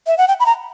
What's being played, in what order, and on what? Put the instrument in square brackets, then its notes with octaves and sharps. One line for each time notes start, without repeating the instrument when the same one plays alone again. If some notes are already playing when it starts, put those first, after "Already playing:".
[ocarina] E5
F#5
G5
B5
A#5